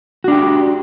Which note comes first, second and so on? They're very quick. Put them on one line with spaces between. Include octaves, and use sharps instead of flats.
F#4 D4 G4